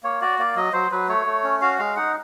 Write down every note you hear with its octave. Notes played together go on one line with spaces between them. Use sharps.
A#3 C#5
F#4 D5
A#3 D5
F#3 D#5
F#3 C5
F#3 B4
A3 C#5
A3
C#4
F#4 F5
G#3 F5
D#4 F#5